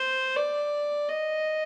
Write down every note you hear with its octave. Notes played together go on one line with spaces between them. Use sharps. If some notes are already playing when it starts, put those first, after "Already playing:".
Already playing: C5
D5
D#5